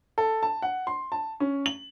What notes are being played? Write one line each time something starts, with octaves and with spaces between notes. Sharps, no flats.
A4
A5
F#5
C6
A5
C#4
F#7